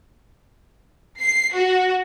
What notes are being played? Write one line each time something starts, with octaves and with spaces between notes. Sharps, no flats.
C7
F#4